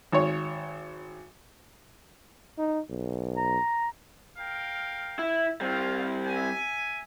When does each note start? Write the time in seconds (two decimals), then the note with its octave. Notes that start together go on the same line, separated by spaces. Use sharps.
0.12 G#1 C#5
2.58 D#4
2.90 B1
3.37 A#5
4.38 A#4 F5 G5
5.19 E4
5.61 G3 C4 F4 F5
6.27 E5 G#5